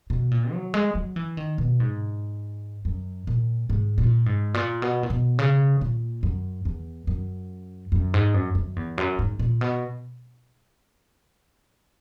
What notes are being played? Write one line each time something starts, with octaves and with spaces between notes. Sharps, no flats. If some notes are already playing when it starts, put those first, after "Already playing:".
B2
A#2
F#3
G#3
F#3
E3
D#3
B2
G#2
F#2
A#2
G#2
A#2
G#2
A#2
B2
A#2
B2
C#3
A#2
F#2
E2
F#2
F#2
G#2
F#2
F#2
E2
F#2
G#2
A#2
B2